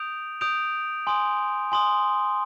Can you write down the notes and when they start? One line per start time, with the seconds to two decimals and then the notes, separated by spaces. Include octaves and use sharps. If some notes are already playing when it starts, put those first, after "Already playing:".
Already playing: D#6 G6 D7 F7
0.41 D#6 G6 D7 F7
1.07 G#5 C6 D#6
1.72 G#5 C6 D#6